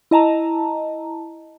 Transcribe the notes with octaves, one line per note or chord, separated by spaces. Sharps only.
E4 D#5 A5 A#5